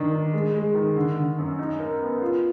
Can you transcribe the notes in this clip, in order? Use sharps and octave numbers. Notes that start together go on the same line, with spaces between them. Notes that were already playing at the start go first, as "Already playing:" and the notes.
Already playing: D#3 D4
D#3
G#3
G#3
D#3
D3
D3
F#2
D#4
A#4
B3
F4